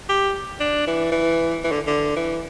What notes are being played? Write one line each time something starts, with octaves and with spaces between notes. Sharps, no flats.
G4
D4
E3
E3
E3
D3
D3
E3